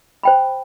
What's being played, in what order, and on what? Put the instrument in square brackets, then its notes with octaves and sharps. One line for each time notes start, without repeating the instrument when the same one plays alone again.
[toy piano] C5 G5 B5